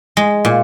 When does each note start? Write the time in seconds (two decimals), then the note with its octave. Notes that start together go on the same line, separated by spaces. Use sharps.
0.17 G#3
0.45 A#2